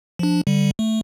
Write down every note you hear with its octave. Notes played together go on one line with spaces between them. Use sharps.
F3 D4
D3 G3
A3